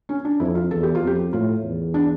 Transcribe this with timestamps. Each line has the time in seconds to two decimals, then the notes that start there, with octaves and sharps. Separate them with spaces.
0.09 C#4
0.25 D4
0.40 F2 E4
0.55 F4
0.71 E2 A4
0.83 G4
0.95 F4
1.02 F2
1.07 G4
1.33 A2 F4
1.63 E2
1.94 D4